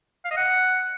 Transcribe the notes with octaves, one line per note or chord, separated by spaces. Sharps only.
F5
D#5
F#5